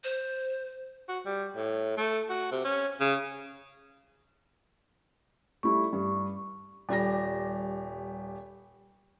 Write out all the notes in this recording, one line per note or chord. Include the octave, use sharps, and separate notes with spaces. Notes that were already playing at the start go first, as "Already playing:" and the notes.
C5
F#4
G3
A2
A3
F#4
C3
C#4
C#3
G3 A3 E4 C#6
G2
D#1 G3 G4 A#6